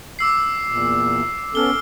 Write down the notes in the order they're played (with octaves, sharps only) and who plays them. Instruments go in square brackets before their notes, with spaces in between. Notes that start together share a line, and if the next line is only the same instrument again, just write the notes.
[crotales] D6 E6 C7
[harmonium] E2 A#2
[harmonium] B3 C#4 A4 [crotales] F6 G7